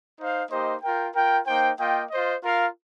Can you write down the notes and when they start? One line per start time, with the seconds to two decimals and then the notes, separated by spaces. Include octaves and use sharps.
0.18 D#4 C5 F5
0.50 A#3 D#4 G4 C5 D#5
0.82 F4 A#4 G5
1.14 F4 A#4 G5
1.46 A#3 D#4 C5 G5
1.78 A#3 F4 D#5 G5
2.09 F4 C5 D#5
2.42 F4 A#4 F5